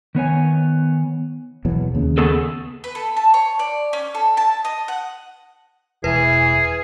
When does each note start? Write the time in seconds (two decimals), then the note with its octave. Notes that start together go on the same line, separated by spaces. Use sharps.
0.15 D#3 B3 C#5 G#5
1.65 E2 B2 F#3
1.95 D#2 C#3
2.18 B3 G#4 A4
2.84 B4
2.95 A4
3.17 A5
3.34 C#5
3.59 D5
3.93 C#4
4.15 A4
4.37 A5
4.65 D#5
4.88 F#5
6.04 E1 E3 G#4 B4